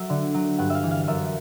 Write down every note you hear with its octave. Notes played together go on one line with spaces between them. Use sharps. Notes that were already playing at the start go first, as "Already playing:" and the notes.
Already playing: F#3 E5
D3
F#3
G2 F#5
E5 F5
E3
F5
F#2 E5 F5